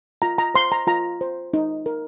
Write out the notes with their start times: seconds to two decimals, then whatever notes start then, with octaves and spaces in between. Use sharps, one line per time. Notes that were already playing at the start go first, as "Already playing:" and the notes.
0.22 F4 A#5
0.38 A#5
0.54 C5 C6
0.72 A#5
0.87 F4 A#5
1.21 C5
1.54 D#4
1.86 A#4